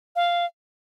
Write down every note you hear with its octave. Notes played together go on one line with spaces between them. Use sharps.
F5